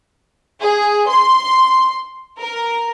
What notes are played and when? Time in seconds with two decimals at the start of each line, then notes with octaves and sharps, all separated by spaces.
0.62 G#4
1.08 C6
2.39 A#4